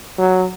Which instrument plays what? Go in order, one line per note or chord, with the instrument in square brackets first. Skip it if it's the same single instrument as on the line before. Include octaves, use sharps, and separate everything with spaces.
[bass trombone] F#3